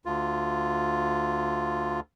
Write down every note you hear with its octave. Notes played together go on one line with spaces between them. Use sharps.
D2 F4